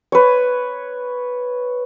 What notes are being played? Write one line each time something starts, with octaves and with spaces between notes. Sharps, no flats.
B4 C#5